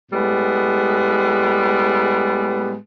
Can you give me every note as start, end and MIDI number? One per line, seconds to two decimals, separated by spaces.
0.12 2.76 45
0.12 2.76 55
0.12 2.76 56
0.12 2.76 59